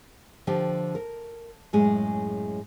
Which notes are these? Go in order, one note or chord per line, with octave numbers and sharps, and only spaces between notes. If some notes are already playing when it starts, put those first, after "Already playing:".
D3 F3 G4 G5
A#4
F#2 A2 G#3 G#4